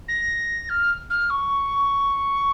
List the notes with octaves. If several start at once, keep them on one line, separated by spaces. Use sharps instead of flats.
A#6
F6
F6
C#6